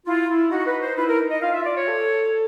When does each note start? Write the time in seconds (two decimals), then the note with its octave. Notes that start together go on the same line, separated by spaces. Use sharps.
0.06 E4 F4
0.29 E4
0.51 D#4 F#4
0.67 B4
0.82 C5
0.97 F4 B4
1.01 E4
1.08 A#4
1.20 D#4
1.31 D#5
1.42 F4 F5
1.54 E5
1.65 D5
1.76 C#5
1.87 A4